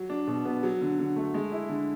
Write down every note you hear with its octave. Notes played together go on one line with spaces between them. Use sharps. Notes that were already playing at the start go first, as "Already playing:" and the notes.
Already playing: F#3
D4
B2
B3
F#3
D3
D3
A3
G#3
E4
D3